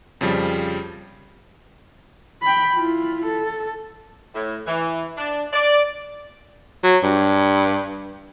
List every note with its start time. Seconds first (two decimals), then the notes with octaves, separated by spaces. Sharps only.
0.21 F2 C#3 F3 G3
2.42 G5 B5
2.74 E4 F4
3.27 A4
4.34 A2
4.66 E3
5.17 D4
5.52 D5
6.84 F#3
7.03 G2